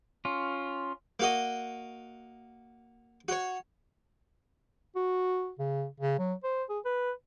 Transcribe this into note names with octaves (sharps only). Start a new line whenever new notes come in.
C#4 F4
A#3 F#4 D#5
F#4 C#5
F#4
C#3
C#3
F#3
C5
G#4
B4